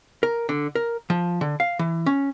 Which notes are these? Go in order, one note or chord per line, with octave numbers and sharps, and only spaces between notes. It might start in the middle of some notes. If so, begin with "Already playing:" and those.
A#4
D3
A#4
F3
D3
F5
E3
C#4